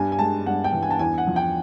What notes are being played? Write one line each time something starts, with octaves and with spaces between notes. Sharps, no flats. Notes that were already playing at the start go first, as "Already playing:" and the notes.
Already playing: G2 G3 G#5
G#5
G#3 A5
G2 F#5
G5
E3
G#5
A5
E2 G#5
F#5
F3
G5